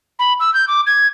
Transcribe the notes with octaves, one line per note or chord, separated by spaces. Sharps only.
B5
E6
G6
D6
G#6